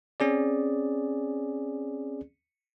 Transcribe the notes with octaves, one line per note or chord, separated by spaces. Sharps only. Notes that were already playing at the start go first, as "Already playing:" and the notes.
C4 C#4 G#4 D5